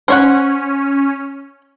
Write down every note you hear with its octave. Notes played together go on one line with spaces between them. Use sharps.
C#4 C5 C#5 F#5